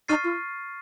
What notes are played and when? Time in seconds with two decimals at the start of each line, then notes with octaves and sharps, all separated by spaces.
0.08 D#4 C#6 F6 A6 C7 D#7
0.24 F4